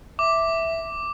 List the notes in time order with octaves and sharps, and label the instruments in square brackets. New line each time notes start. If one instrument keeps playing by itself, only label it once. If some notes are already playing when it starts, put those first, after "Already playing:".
[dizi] E5 [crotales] D6